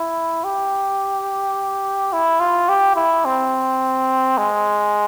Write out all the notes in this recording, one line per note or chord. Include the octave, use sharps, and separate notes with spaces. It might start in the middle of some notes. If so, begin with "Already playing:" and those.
Already playing: E4
G4
E4
F4
G4
E4
C4
G#3